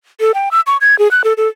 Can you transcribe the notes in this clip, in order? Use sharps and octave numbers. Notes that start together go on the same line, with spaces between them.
A4
G5
E6
C#6
G#6
G#4
F#6
A4
A4